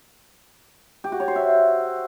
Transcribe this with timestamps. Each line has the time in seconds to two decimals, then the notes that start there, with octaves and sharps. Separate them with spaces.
1.04 G4
1.12 F#4
1.20 C#5
1.28 C5
1.36 E5